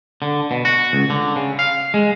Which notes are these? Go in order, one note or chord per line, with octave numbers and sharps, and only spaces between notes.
D3
B2
F#4
C#2
D3
C#3
F5
G#3